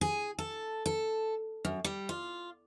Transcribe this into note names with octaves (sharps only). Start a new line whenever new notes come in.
G#4
A4
A4
F#2
G3
F4